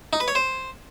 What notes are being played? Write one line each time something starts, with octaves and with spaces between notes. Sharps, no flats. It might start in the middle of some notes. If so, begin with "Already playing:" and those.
D#4
B4
C#5
C5